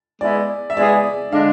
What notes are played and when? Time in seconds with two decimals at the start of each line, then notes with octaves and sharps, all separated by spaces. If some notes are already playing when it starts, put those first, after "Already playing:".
0.21 G#3 B3 E4 G#4 D5
0.70 E5
0.77 G#3 B3 E4 G#4 D5
1.32 D3 G#3 D4 F5